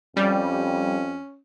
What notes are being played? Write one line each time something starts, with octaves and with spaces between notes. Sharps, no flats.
F2 G3 C#4